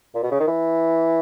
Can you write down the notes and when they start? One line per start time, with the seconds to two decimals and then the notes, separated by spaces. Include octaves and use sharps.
0.15 A#2
0.23 B2
0.31 C#3
0.40 D#3
0.48 E3